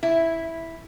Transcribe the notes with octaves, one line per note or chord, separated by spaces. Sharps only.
E4